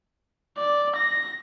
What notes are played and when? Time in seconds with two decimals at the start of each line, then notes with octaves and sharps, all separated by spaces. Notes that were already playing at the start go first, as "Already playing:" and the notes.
0.57 D5
0.96 A#6